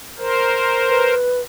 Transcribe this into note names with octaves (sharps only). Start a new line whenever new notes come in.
A#4 C5
B4